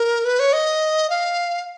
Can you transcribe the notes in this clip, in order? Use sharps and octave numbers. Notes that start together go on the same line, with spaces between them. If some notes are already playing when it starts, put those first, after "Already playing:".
Already playing: A#4
B4
C#5
D#5
F5